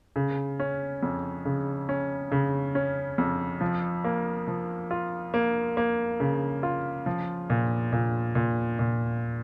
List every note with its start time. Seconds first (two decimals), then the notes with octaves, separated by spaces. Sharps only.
0.16 C#3
0.59 C#4
1.03 F2
1.45 C#3
1.89 C#4
2.32 C#3
2.75 C#4
3.18 F2
3.61 F3
4.04 A#3
4.48 F3
4.91 F4
5.34 A#3
5.77 A#3
6.20 C#3
6.63 F4
7.06 F3
7.50 A#2
7.92 A#2
8.35 A#2
8.79 A#2